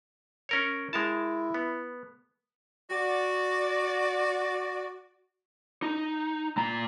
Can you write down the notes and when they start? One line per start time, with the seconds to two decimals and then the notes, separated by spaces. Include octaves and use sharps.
0.49 C#4 A#4 C#5
0.93 G#3 E4 A#4 A5
1.54 B3
2.90 F#4 D5
5.82 D#4
6.57 A#2 A#5